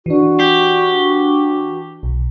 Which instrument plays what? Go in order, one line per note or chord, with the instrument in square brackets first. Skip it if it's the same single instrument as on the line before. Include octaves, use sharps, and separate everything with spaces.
[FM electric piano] E3 D4 [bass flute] F#4
[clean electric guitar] G4
[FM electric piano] B1